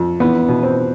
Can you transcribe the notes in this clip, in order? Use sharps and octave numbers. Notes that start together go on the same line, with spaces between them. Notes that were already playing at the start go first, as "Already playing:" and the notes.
Already playing: F2
E2 B3
B2
C4